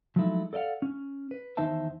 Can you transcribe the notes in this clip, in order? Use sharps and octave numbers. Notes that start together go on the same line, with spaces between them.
F3 F#3 G#3 A3 D#4 E4
A4 D5 D#5 F5 F#5
C#4
B4
E2 D#3 D#4 C5 E5 A5